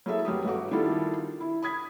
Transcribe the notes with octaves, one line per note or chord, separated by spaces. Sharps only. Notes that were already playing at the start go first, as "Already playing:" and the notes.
F#3 A#3 E4 G#4 A4 E5
F1 F#3 G3 G4 D#6
G1 A3 F#4 D6
D#3 G3 D4 E4 F4 A4
E4
B5 D#6 G#6 B6